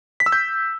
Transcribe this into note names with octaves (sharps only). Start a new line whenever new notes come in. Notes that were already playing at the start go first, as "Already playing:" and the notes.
B6
E6
G6